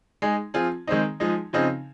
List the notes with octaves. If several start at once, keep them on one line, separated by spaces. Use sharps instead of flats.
G#3 D#4 G#4
F3 C4 F4 G#4
D#3 G#3 C4 D#4
F3 G#3 D#4
C#3 F3 C4 D#4 G#4